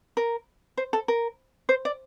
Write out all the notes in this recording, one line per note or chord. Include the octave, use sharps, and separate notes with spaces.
A#4
C5
A4
A#4
C5
D5